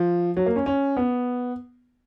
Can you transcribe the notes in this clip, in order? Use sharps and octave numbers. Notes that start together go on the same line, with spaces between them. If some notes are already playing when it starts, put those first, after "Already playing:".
Already playing: F3
F#3
A#3
C#4
C#4
B3